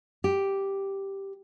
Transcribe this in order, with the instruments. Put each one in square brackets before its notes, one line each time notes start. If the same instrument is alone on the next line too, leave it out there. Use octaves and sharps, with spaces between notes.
[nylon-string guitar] G4